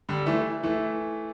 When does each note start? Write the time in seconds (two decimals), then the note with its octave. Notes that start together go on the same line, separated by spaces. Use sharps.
0.09 D3 G3
0.26 E3 A3
0.63 E3 A3